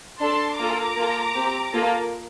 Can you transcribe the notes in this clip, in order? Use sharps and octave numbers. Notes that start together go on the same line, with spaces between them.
D4 A4 A5 C6
A#3 F4 A4 A#5 D6
A#3 F4 A4
C4 G4
A#3 F4 A4